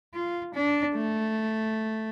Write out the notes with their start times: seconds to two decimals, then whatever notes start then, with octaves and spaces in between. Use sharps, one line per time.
0.14 F4
0.55 D4
0.95 A3